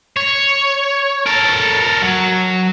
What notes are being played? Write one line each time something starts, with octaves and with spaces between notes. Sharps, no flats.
C#5
A4 A#4
F#3